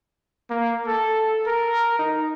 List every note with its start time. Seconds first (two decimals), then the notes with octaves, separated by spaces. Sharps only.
0.50 A#3
0.87 A4
1.47 A#4
1.99 D#4